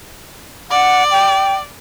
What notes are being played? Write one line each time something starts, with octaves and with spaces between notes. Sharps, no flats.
D5 F#5
G5